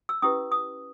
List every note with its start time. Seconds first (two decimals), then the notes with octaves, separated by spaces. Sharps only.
0.09 E6
0.22 C#4 E4 G4 B4 D#6
0.52 D#6